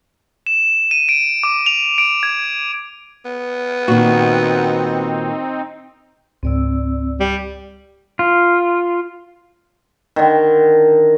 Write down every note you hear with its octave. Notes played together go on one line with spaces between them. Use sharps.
E7
D#7
D7
D6
F7
D7
G#6
B3
A#2 D#3 C4 D#4 F#4
C#2 G#2 C4 D5 E6
G3
F4
D3 D#3